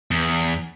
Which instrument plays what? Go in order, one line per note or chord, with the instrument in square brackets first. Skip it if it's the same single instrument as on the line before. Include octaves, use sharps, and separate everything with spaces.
[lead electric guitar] E2